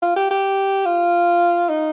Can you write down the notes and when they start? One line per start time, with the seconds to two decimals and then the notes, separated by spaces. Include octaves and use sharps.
0.02 F4
0.16 G4
0.31 G4
0.85 F4
1.70 D#4